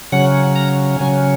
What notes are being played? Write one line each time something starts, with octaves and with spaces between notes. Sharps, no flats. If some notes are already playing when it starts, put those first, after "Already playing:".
C#3 F#3 C#4 F#5
A#5
C#3 F#3 C#4 G#5